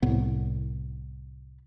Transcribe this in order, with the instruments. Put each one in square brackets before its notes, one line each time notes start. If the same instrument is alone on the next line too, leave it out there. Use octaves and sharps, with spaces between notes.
[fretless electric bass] C2 A2 B3